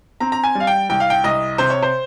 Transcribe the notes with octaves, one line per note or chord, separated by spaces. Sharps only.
C4 A#5
A#5
G#5
G3 F5
G5
C2 G5
F5
G5
C2 D#5
C3 C5
C#5
C5